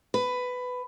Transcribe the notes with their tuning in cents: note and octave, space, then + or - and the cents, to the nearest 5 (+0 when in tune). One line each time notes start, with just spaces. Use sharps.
B4 +15